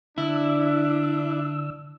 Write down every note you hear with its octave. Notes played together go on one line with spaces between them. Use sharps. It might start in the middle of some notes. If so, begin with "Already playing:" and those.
D3 D4 E4 E6